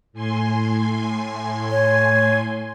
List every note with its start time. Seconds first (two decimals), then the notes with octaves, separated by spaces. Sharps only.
0.13 A2 G#5 C6
1.71 C#5